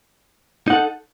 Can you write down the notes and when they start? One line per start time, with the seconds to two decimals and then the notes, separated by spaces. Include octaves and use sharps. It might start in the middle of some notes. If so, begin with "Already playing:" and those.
0.68 D#4
0.70 F#5
0.73 A4